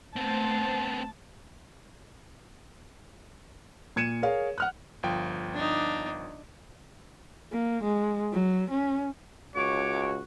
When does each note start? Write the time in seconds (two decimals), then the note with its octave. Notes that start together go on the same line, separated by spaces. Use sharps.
0.16 A3 B3 C4 C5 A5
3.96 A#2 G#6 C#7 D#7 E7
4.22 G#4 A#4 C#5 F5
4.58 F#5 F6 F#6
5.03 G1 F3 G5
5.54 D4 D#4
7.52 A#3
7.84 G#3
8.33 F#3
8.71 C#4
9.55 C#2 F#4 C#5 D6